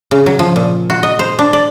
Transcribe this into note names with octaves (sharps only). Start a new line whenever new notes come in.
C#3
F#3
F3
A#2
F#4
D#5
C5
D4
D5